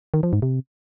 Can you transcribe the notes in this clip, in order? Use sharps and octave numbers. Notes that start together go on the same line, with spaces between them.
D#3
F3
G#2
C3